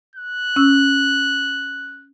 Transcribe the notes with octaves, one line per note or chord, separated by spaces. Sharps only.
F#6
C#4 E6